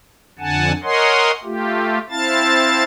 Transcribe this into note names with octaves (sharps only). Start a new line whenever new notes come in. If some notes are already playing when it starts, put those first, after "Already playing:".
F2 D3 F#5 G#5 A5
A#4 C#5 D#5 F#5 G#5 C6
A3 F4 G4
C4 E4 F5 A5 A6